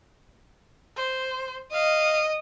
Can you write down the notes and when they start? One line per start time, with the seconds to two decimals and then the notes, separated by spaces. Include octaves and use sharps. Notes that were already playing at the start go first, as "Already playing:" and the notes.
0.97 C5
1.73 D#5 F5